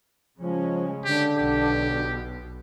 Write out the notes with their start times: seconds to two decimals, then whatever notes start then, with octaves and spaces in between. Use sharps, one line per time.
0.39 C#3 F3 G#3 C#4
1.05 D3 G4
1.37 B1 B2 G4